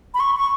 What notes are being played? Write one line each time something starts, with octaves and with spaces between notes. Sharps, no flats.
B5
C#6
C#6